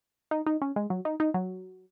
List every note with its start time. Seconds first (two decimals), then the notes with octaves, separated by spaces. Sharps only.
0.31 D#4
0.47 D#4
0.62 C#4
0.76 G#3
0.90 F#3
1.05 D#4
1.20 D#4
1.34 F#3